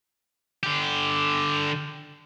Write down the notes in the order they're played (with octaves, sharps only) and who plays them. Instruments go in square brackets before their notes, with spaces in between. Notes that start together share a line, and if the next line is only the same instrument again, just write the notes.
[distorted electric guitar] D3 G4